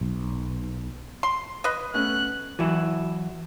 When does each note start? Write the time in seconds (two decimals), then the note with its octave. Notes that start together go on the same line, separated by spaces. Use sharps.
0.01 B1
1.23 C6
1.64 B4 D#5
1.94 A3 B3 C#4 F#6
2.59 E3 F#3 E4